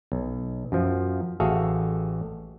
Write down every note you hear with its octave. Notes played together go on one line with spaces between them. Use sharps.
B1
F#2 F3
A1 F#4 G#4 A4 E5 F5